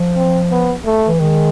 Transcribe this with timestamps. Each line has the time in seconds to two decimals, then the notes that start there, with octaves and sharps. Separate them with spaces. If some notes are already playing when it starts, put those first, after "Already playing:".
Already playing: F3
0.16 C4
0.51 B3
0.85 A3
1.07 E3
1.20 D#3 G#3